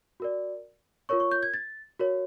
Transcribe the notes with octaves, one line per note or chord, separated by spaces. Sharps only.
F#4 A#4 D5
F4 A#4 C#5 C#6
C#6
G6
G#6
A6
F#4 A#4 C#5